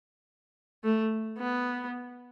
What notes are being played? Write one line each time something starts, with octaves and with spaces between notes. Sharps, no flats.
A3
B3